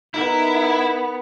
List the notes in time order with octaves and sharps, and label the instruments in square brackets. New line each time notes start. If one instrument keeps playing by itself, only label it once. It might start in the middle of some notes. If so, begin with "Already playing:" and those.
[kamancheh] B3 [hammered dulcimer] D#4 A#4 [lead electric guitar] E4